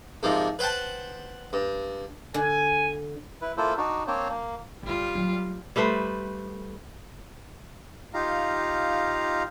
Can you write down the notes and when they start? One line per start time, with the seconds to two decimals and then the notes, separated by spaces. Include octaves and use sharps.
0.23 G#2 C3 F3 A#3
0.59 B4 C5 F#5 G5 A5
1.53 G2
2.34 D3 G#5
3.41 E4 B4
3.57 A#3 E4 F4 A4 C5
3.77 D4 D#4 F#4
4.07 A#3 C4 D4 C5 C#5
4.29 A#3
4.83 F1 D3 G3 F4
5.15 F#3 A3
5.76 G3 A3 B4 C5
8.14 D#4 F4 G4 F5 A#5